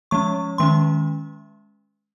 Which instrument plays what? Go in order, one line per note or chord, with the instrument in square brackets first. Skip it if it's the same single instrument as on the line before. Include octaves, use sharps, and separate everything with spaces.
[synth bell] F3 G#3 C#4 C#6
D#3 G#3 C#4 C6